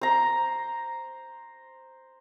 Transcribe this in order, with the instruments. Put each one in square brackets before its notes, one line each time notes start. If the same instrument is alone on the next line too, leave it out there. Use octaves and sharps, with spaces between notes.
[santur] C5 A#5